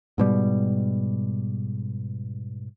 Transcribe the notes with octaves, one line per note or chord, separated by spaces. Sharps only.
G#2 B2 G3